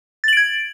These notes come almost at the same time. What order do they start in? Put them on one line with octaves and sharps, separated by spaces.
A6 F#7 D7 G#6